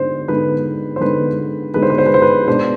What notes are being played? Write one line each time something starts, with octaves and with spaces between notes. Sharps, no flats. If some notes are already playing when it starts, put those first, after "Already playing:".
Already playing: D3 G#3 B3 D#4 C5
D3 G#3 B3 D#4 B4
C5
D3 G#3 B3 D#4 B4
D3 G#3 B3 D#4 B4
C5
B4
C5
B4
C5
B4
B2 G#3 D4 C5